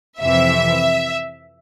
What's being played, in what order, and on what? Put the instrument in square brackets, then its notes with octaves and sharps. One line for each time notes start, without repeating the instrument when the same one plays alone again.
[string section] F2 C3 E3 E5